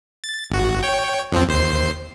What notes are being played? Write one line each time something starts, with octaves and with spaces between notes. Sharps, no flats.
A6
G#1 F#4
C#5 G5
F2 F3 C4
D#2 C5 C7